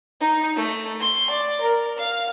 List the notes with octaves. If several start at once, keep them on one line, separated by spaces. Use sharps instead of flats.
D#4
A3
C6
D5
A#4
F5